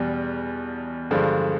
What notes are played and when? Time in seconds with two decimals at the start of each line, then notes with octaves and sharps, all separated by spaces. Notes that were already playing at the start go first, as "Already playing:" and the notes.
Already playing: E2 B2 G3
1.11 G2 D3 F3 G#3